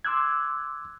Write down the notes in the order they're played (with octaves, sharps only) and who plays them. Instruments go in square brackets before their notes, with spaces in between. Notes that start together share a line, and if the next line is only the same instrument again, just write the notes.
[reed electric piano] C6 D6 E6 F#6 G#6